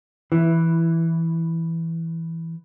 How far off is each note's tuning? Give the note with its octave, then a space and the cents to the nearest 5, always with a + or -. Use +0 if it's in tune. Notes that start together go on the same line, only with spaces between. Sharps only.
E3 +0 E4 +10